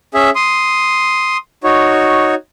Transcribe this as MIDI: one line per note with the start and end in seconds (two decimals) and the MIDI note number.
0.14 0.30 61
0.14 0.30 68
0.14 0.30 76
0.35 1.37 84
0.35 1.37 87
1.64 2.35 63
1.64 2.35 66
1.64 2.35 73